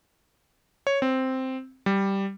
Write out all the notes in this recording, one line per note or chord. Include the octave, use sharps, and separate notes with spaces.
C#5
C4
G3